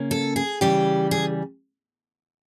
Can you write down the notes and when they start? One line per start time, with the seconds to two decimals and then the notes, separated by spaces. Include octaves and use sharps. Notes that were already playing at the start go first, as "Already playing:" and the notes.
Already playing: C#3 A#3 C#4
0.11 A4
0.36 G#4
0.61 C#3 E3 G3 G4
1.11 G#4